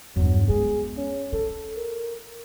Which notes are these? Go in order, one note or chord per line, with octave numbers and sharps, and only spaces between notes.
E2 G2 F#3
G#3 B3 G#4
C#4
F4 A4
A#4